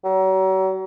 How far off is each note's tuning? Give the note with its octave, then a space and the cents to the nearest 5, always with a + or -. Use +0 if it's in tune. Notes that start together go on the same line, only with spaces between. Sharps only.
F#3 +40